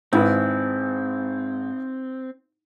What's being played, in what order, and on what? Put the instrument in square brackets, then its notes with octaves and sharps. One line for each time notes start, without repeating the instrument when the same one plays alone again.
[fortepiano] G#1 E4 B4 [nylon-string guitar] G#2 [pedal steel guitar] C4